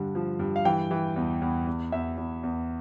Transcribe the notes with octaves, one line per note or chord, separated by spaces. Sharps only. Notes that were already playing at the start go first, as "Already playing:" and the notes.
Already playing: G2 D3
F3
G2
F5
E3 G5
E3
E2
E2
E2
E2 E5
E2
E2